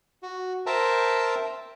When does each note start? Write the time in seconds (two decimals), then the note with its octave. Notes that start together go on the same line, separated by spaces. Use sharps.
0.23 F#4
0.66 A#4 C5 E5 G5 A5 A#5